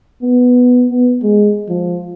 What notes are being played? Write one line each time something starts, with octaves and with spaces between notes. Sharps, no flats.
B3
B3
G#3
F3